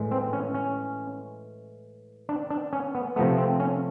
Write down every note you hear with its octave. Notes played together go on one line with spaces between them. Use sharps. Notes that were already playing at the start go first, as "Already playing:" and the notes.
Already playing: A2 E3 G#3
C4
C#4
C#4
D4
D4
C#4
B3
C3 F3 A3 B3
C4
C#4